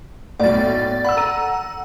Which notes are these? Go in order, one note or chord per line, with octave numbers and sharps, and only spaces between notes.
B1 A2 D5 A6
F#5 B5 E6
A4 A#5 D#7